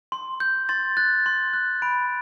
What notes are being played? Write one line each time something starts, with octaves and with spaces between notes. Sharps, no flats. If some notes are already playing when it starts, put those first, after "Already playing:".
C6
G6
C6 A6
F#6 A6
C6
F#6
B5 D7